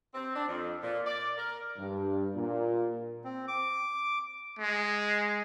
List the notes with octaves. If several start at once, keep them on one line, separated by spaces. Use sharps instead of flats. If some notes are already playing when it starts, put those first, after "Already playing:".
C4
D4
F2
A#2
D5
A#4
G2
A#2
C4
D6
G#3